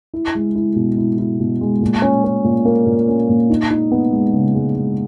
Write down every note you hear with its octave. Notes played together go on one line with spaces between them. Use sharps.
E4
G#3
E4
B2
E4
E4
B2
G#3
A#2
C#4
C#4
A#2
A#3
A#2
C#4
A#2
D#4
D#4
B3
G#3
C#3
G#3
G#3